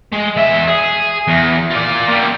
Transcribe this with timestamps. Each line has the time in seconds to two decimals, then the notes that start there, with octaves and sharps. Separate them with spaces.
0.13 G#3
0.37 E2 E5
0.68 G#4
1.28 E2
1.70 F4 D5
2.08 G3 A#3